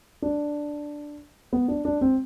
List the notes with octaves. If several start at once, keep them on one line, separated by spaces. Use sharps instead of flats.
D4
B3
D4
D4
C4